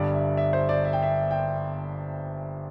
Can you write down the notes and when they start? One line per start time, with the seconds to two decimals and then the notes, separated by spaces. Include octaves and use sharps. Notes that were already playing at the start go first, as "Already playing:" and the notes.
Already playing: G1 G2 G3 D5
0.14 E5
0.37 E5
0.53 C5
0.69 D5
0.84 E5
0.93 G5
1.02 E5
1.31 G5